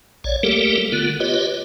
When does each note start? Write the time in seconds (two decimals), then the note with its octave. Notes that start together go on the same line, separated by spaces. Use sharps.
0.24 A#1 C#5 D5
0.43 G3 A3 A#3 G4 A4 A#4
0.92 D3 B3 F4
1.20 F4 G4 B4 C#5 D#5